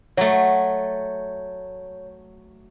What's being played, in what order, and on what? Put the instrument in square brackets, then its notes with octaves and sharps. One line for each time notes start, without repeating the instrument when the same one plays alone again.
[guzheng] F#3 A3 [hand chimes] C#5